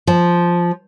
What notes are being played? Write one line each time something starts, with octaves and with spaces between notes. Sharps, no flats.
F3